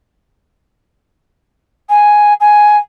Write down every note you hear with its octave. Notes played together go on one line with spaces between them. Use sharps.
G#5
G#5